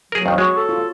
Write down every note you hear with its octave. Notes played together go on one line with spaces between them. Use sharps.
F#3 G#4 A#4
F2 D#3
G#3 F#4 C#5
A4
F4